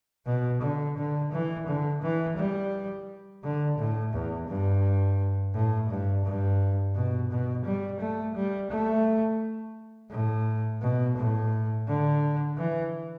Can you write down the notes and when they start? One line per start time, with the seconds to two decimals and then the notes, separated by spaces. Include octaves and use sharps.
0.26 B2
0.62 D3
0.97 D3
1.32 E3
1.67 D3
2.02 E3
2.37 G3
3.43 D3
3.78 A2
4.13 E2
4.48 G2
5.54 A2
5.89 G2
6.25 G2
6.95 B2
7.30 B2
7.65 G3
8.00 A3
8.35 G3
8.71 A3
10.11 A2
10.82 B2
11.17 A2
11.87 D3
12.58 E3